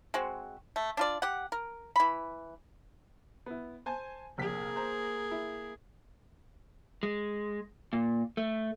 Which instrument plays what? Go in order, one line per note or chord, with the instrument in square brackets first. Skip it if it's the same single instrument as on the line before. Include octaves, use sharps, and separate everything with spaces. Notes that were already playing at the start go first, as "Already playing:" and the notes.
[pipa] G#3 C4 F#4
A3
D4 F4 D5
G4 F#5
A#4
E3 B5
[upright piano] B3 E4
C5 G#5 A5
[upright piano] F1 A#1 B6 [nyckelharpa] A#3 G#4
[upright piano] C5 A#5
E4
[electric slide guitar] G#3
A#2
A3